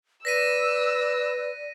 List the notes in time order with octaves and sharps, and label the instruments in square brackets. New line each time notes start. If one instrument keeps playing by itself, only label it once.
[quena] B4 [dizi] D5 [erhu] E6 [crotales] A#6 B6 D#7